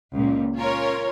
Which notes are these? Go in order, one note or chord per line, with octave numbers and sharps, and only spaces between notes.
C#2 A#2
C#4 F4 A#4 C#5